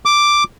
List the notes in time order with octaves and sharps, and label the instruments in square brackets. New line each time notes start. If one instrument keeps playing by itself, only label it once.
[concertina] D6